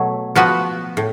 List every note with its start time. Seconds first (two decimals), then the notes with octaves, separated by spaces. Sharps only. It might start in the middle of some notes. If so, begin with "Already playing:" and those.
Already playing: B2 F#3 A3
0.35 F3 B3 F#4 B4
0.97 A2